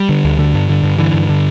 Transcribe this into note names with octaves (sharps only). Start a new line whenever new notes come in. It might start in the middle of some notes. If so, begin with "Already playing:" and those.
Already playing: G3
D3
D2
D3
G2
D3
G2
D3 E3
G2
D3